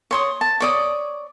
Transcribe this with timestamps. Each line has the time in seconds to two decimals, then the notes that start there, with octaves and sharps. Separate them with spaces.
0.11 C#5 C6 D#6
0.41 A5
0.60 C#5 D5 D#6